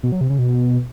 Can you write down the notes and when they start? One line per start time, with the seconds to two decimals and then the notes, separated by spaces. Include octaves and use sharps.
0.03 B2
0.12 F#3
0.21 C3
0.30 C#3
0.38 B2